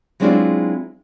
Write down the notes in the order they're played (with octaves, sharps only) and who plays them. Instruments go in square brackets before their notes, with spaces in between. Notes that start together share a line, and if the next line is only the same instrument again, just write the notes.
[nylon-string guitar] F#3 G#3 C4 D4 E4 F4